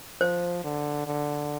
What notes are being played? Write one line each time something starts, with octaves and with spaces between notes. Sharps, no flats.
F3 C5
D3
D3